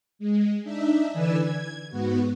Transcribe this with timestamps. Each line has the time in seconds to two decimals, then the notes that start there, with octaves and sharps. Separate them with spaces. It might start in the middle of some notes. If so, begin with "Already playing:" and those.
0.19 G#3
0.63 D4 D#4 E5
1.13 D3 E3 B4 D5 G#5 E6
1.41 G#6
1.90 G#2 B3 F#4